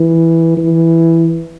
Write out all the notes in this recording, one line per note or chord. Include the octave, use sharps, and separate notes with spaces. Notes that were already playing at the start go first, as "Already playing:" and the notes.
Already playing: E3
E3